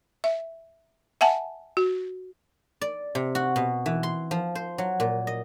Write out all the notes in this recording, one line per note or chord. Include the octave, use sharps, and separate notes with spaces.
E5
E5 F#5 G#5 A5
F#4
D5
C3
F#4
B2
E3
C6
F3
C5
F#3
A#2
D#5